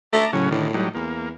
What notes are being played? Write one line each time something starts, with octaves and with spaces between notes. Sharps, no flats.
A3 A5 A#5 D6
A2 C#3 F#3 C#4
A2 D3 D#3
F#3 G3 D#4
E2 A#3